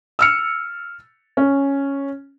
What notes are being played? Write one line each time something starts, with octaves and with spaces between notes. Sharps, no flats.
E6 F6 C#7
C#4